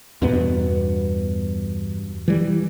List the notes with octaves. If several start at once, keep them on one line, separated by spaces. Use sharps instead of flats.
E2 G2 B2 B3
E3 G3